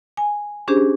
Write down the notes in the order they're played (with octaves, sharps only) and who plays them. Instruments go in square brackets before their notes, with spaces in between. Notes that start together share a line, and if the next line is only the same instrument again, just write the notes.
[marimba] G#5
C#4 D4 G4 G#4 C5